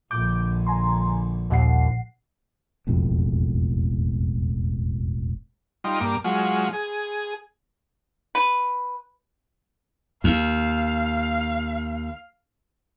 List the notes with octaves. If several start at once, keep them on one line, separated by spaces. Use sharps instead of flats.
A#1 D3 D6 G6
G#5 A#5 C6
D#2 A#2 F#5 C7
E1 A1 F2
G3 D#4 F4 C6
G2 A#3 D6
F#3 G#3 F4
G#4
B4
D#2 F5